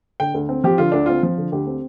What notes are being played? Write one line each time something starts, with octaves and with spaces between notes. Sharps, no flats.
D3 G5
D2
C4
F3 G4
D3 F4
D2 D4
C4 F4
F3
D3
D2 G4
C4